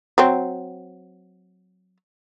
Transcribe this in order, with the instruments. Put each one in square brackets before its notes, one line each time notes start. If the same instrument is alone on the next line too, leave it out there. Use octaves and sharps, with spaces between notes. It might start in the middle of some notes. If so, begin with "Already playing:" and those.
[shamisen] F#3 C4